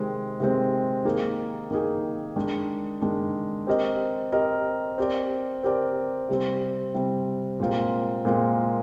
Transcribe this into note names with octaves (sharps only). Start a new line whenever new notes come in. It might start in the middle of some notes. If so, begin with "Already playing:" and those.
Already playing: C3 D#3 G#3 C4
C3 D#3 G#3 C4
D#3 A#3 D#4 G#4
D#3 A#3 D#4 G#4
D#3 G#3 D4
D#3 G#3 D4
C4 G4 A#4 D#5
C4 G4 A#4 D#5
C4 G4 A#4 D5
C4 G4 A#4 D5
C3 G3 C4
C3 G3 C4
A#2 G#3 C4 F4 A#4
A#2 G#3 C4 F4 A#4